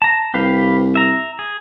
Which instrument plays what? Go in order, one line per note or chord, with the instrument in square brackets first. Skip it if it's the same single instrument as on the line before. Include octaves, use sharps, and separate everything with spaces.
[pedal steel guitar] A5 A#5
[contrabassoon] C2 [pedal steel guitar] G4 B4 F5
[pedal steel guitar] E5 A#5
G#4